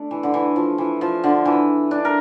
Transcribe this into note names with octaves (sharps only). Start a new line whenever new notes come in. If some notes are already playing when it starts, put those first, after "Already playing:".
Already playing: A3 D4
E3
D3
E3
F3
E3
F3
D3
E3
D4
A#4